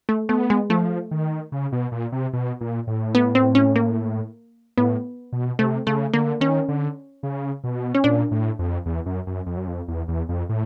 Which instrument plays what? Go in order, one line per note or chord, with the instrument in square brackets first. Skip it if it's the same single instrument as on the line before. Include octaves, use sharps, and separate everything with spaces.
[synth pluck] A3
[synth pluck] A3 [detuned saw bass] B3
[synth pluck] G#3
[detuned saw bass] F3 [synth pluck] A3
[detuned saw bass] D#3
C#3
B2
A#2
C3
B2
A#2
A2
[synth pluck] B3
C4
C#4
A#3
[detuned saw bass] A2 [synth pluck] B3
[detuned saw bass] B2
[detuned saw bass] C3 [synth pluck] A3
[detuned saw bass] C#3 [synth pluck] A3
[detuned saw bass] D3 [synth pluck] A#3
[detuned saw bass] D#3 [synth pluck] C#4
[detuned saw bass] D3
C#3
B2
[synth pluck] C#4
[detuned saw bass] A#2 [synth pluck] D4
[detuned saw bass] A2
F2
E2
F#2
F#2
F2
F#2
F2
E2
E2
F2
A2